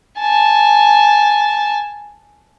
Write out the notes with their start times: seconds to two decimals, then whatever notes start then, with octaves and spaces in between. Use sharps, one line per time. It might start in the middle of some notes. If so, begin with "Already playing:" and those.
0.20 G#5 A5